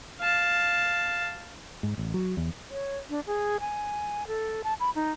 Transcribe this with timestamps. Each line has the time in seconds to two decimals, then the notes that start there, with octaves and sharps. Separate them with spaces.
0.20 F5 A5
1.83 G#2
1.98 A1
2.14 F#3
2.37 E2
2.71 C#5
3.10 D4
3.27 G#4
3.60 G#5
4.27 A4
4.64 A5
4.80 B5
4.95 D#4